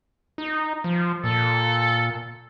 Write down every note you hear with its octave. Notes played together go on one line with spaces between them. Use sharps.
D#4
F3
A#2 A4